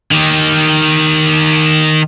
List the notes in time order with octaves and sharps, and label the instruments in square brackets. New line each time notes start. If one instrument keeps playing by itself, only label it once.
[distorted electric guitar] D#3 G4